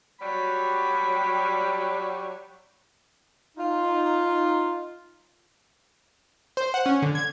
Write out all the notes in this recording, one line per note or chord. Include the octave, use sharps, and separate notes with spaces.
F#3 G3 B5
D#4 F4
C5
F#5
C#4
D3
G#6